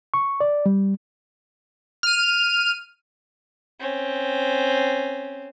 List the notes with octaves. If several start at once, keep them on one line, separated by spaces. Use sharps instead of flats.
C#6
D5
G3
F6 D#7
C4 C#4